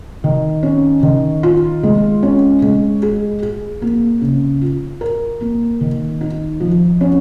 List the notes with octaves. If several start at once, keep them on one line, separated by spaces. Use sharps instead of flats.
D#3
C#4
D#3
F4
G#3
C#4
G#3
G#4
G#4
A#3
C#3
F4
A#4
A#3
D#3
D#4
F3
C#4